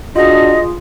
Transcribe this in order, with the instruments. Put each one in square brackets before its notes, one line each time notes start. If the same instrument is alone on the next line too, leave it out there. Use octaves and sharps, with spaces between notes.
[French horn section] D4 F#4 [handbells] F4 G#4 [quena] D#5